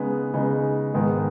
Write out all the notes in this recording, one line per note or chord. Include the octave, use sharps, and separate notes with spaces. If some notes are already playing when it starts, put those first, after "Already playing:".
Already playing: C#3 G#3 B3 D#4
C#3 G#3 B3 D#4
G#2 D#3 G#3 B3